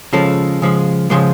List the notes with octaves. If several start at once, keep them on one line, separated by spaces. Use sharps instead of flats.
C#3 F3 G#3 A4
C#3 F3 G#3
C#3 F3 G#3 C5